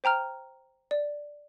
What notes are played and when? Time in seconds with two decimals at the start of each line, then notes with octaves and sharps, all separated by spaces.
0.04 C5 G5 A#5 F6
0.91 D5